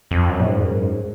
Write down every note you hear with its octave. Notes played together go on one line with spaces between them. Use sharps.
F2
F#2
A#2
G#2
F#2
G#2